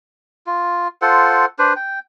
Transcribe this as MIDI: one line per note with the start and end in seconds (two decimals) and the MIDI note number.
0.47 0.88 65
1.02 1.45 65
1.02 1.45 69
1.02 1.45 72
1.02 1.45 78
1.59 1.73 62
1.59 1.73 71
1.59 1.73 72
1.76 1.99 79